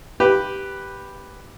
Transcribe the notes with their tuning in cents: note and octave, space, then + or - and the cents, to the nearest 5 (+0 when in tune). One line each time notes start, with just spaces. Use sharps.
G4 +0 B4 +0